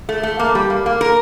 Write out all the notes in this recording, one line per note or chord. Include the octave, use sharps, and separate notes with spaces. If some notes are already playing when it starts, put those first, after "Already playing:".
A3
A3
A#3
G3
A#3
A#3
A#4